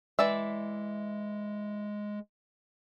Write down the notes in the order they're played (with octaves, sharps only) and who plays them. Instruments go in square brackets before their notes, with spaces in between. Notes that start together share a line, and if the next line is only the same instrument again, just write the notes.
[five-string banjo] E3 D5 E5 [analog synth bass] G#3